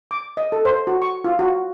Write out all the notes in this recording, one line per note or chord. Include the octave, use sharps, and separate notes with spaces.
D6
D#5
A4
C5
F#4
C#6
F4
F#4